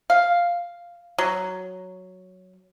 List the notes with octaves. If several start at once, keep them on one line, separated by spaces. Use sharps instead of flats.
F5
F#3